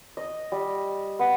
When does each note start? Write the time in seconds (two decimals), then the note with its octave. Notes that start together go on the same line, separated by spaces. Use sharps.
0.17 D#5
0.52 G3
1.19 B3